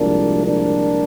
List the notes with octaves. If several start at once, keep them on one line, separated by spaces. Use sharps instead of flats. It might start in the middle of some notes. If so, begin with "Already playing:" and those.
Already playing: C2 A#2 F3 G#3 A#3 D4
A#3 D4